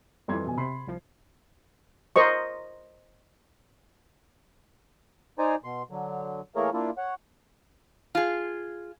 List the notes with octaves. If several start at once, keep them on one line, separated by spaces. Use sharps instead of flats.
F2 E3 G3 C6 G#6
B2 G#5
C3 B5 C6 C7
C2 F3
A#4 C5 D#5 C#6
D#4 C5 D5 G#5 A#5
B2 C6
D3 F#3
E3 A3 A#3 G#4 A#4 C#5
A#3 D4 E4 F4
C#5 F#5
F4 G#4